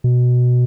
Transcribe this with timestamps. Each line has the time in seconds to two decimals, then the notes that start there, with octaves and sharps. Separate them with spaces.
0.04 B2